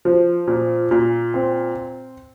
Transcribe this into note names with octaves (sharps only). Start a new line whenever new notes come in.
F3
A#2
A#2
C4